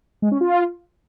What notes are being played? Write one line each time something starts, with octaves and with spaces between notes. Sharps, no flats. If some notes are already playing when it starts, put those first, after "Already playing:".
G#3
C#4
F4